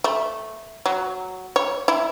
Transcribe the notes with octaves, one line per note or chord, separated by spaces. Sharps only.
A3
F#3
C#5
E4